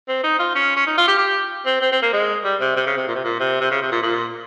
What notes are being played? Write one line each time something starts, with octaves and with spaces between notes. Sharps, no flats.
C4
D#4
F4
C#4
C#4
D#4
F4
G4
G4
C4
C4
C4
A#3
G#3
G3
C3
C3
C#3
C3
A#2
C3
A#2
C3
C3
C#3
C3
A#2
A#2